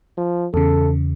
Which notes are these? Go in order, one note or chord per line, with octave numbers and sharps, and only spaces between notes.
F3
E2 C#3 A4